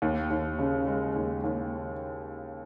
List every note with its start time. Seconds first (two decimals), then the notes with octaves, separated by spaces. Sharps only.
0.02 D#2
0.30 D#2
0.59 C#3
0.87 G#3
1.16 D#2
1.44 D#2